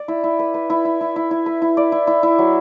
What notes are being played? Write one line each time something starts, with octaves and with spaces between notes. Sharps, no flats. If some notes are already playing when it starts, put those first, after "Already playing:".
Already playing: D5
E4
E4
B4
B4
E4
E4
E4
E4
E4
B4
E4
D5
E4
E4
E4
F#3